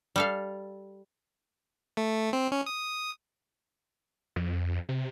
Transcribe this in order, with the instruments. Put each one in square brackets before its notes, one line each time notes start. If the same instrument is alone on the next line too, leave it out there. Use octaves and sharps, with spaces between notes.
[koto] G3 A4 F5
[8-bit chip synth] A3
C4
C#4
D#6
[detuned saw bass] F2
C3